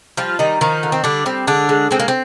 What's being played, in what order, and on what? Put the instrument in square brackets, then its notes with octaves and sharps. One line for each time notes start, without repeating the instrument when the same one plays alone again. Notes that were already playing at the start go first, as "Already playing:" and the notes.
[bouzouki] F3 G3 F4
D#3 G3 D#4
D#3 F3 D#4
D3
C4
D3 G3 D4
G3 C4
D3 G#3 D4
G#3
G#3 C4
A#3
C4